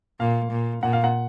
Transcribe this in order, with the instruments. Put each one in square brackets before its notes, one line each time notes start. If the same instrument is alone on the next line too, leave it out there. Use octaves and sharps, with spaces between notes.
[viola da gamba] A#2 [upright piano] F5
[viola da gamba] A#2
[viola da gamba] A#2 [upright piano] F#5
[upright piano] F5
F#5